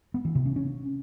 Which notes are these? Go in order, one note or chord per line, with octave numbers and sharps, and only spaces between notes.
B3
E3
C3
C#4
C#4